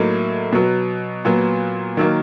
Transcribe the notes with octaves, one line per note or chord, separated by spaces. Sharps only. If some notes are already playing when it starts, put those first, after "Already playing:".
Already playing: A2 F#3 A#3 D#4
B2 F#3 B3
A#2 F#3 B3
D#3 F#3 A#3